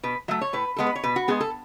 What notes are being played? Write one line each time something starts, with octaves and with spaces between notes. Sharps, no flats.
B2 B4
F#3 A3 E5
C#5
A2 B4
G#3 B3 A4
B4
C#5
B2 B4
F#4
G#3 B3 G#4
A4